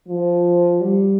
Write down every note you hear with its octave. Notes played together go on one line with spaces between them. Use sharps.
F3
G3